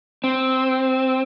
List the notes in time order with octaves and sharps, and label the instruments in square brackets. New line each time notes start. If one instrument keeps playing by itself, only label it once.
[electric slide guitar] C4